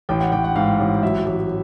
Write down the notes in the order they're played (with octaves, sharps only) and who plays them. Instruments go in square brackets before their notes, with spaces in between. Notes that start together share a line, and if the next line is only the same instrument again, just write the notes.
[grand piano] A1 G5
F#5
A1 G5
F#5
G#2 F5
A1
F#3 E5
A1